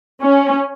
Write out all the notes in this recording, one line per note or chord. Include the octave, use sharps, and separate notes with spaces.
C#4